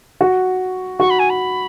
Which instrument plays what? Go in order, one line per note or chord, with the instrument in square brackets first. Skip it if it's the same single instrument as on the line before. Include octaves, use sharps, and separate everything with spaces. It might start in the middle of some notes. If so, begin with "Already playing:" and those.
[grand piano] F#4
[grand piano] F#4 [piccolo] C#6
[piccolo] B5
G#5
B5